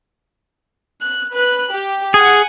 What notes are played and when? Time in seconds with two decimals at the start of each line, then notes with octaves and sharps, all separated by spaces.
1.03 F#6
1.34 B4 F#6
1.73 G4
2.14 G#4 F#5 G#5